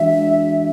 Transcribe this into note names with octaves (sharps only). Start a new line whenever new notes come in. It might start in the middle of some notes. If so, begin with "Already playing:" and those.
Already playing: E3 G#3 D4 F#4 E5